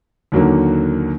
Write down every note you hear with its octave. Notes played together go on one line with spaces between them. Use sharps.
D#2 D3 F#3 A#3